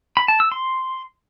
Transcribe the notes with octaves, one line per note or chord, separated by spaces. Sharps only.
B5
A5
E6
C6